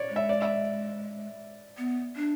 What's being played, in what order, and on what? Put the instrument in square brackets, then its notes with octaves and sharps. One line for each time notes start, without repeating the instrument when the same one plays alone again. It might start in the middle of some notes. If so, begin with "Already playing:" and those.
Already playing: [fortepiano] C#5 D5
[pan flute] G#3
[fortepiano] E5
D5
E5
[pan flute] B3
D4